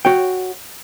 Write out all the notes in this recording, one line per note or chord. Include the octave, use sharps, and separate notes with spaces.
F#4 C#5 G5